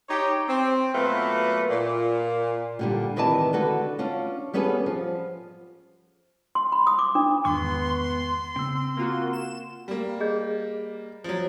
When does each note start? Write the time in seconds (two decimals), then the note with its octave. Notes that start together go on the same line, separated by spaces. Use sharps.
0.09 D#4 G4 C#5
0.48 C4
0.95 B2 F#3 A3 A#3 F4 B4
1.70 A#2
2.79 A#2 D3 G3
3.16 C3 D#3 E3 B4 D5 A5
3.53 D3 F#4 A4 B4
3.99 C#4 D4 F4
4.54 G3 B3 C#4 G#4 A4 B4
4.86 F3
6.55 C6
6.72 B5
6.87 D#6
6.99 D6
7.15 D4
7.45 E2 G#2 D#3 B3 C6 C#6
8.56 C#3 C4 E6
8.96 A#3 F4 F#4
9.33 E7
9.88 G3 A#3
10.20 G#4 D#5 G6
11.24 F3 F#3